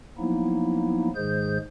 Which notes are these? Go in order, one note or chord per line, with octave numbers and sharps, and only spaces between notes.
F3 F#3 A#3 B3 D#4 E4
G#2 D#3 G#3 G#4 C5 G6